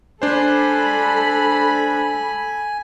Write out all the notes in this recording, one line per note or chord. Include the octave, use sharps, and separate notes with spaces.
D4 A4 C5 G#5 B5